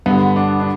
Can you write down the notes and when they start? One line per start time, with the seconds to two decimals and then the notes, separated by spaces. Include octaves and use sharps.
0.06 G2 D3 B3
0.36 D4
0.60 D4